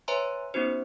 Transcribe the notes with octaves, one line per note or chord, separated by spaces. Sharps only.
B4 C#5 E5 G#5 A#5 C6
B3 C#4 D#4 F#4 C5